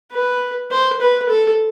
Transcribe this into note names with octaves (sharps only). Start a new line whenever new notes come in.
B4
C5
B4
A4